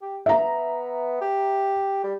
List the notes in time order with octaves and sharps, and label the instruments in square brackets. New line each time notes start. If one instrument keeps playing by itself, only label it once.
[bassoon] G4
[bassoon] B3 [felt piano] E5 A#5
[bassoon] G4
G3